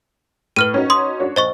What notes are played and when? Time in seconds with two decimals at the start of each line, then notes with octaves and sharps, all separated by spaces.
0.56 A2 B4 F6 D#7
0.74 C#4 D#4 F#4
0.90 C6 D#6
1.20 D4 F#4 C#5
1.36 A#1 C5 D#5 C#6